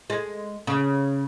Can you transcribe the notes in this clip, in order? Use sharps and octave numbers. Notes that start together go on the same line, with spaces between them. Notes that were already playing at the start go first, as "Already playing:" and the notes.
G#3
C#3